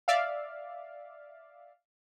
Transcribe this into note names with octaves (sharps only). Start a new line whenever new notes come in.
D5 E5 F5